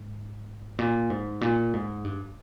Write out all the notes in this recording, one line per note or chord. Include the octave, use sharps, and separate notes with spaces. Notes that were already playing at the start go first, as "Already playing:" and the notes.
Already playing: G#2
A#2
G#2
A#2
G#2
G2